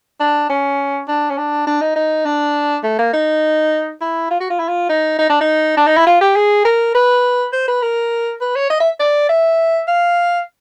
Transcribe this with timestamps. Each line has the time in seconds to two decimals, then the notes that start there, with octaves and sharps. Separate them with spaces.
0.20 D4
0.50 C#4
1.08 D4
1.30 C#4
1.37 D4
1.67 D4
1.81 D#4
1.96 D#4
2.25 D4
2.84 A3
2.99 A#3
3.13 D#4
4.01 E4
4.31 F4
4.40 F#4
4.50 F4
4.59 E4
4.68 F4
4.89 D#4
5.19 D#4
5.30 D4
5.41 D#4
5.77 D4
5.87 D#4
5.97 E4
6.07 F4
6.21 G4
6.36 G#4
6.65 A#4
6.95 B4
7.53 C5
7.68 B4
7.82 A#4
8.41 B4
8.56 C#5
8.70 D#5
8.80 E5
8.99 D5
9.29 E5
9.88 F5